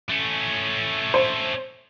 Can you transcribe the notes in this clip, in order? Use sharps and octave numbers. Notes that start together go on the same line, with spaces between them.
A3 C#4
C5